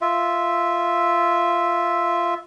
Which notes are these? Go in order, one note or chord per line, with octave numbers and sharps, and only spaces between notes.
F4 E5